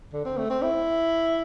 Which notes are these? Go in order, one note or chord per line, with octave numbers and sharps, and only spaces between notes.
D3
C4
A3
C4
E4